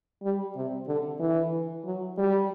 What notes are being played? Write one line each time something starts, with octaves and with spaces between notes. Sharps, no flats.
G3
C3
D3
E3
F#3
G3